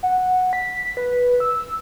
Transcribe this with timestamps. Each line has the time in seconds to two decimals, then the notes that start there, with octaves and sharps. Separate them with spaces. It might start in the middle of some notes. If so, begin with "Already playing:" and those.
0.03 F#5
0.53 B6
0.97 B4
1.40 E6